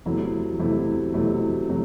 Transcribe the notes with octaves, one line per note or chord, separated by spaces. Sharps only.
E2 C3 F#3 A3 E4
E2 C3 F#3 A3 E4
E2 C3 F#3 A3 E4
C3 F#3 A3